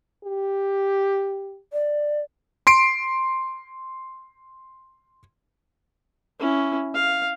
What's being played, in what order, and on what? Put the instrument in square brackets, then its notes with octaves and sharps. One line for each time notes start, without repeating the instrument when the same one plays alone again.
[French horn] G4
[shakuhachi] D5
[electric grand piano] C6 C7 D7
[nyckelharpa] C#4 E4
F5